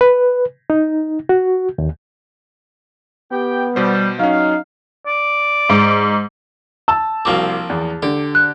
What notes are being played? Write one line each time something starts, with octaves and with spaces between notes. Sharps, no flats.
B4
D#4
F#4
D#2
B3 G4 G5
B2 G3 C5
F#3 C#4 D#4 F5
D5
G#2
A5 E6
C2 F3 A#3 C4 F#4 D6
E2
D3 G4
F#6